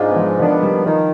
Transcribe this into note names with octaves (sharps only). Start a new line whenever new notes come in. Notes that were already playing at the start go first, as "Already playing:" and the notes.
Already playing: G#2 C4 D4 D#4 F4
B3
F3 G#3
D#3 F3 B3 D4
G3
D#3 F3